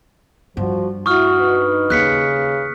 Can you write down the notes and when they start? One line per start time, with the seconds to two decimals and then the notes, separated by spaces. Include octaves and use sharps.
0.57 G2 F3 F#4
1.06 E4 F#4 C#6 D#6 F6
1.40 D#4 B4
1.90 D#2 C#3 F#6 B6 C#7